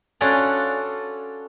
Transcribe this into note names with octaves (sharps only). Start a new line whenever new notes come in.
C#4 D4 F4 F#4 A4 D5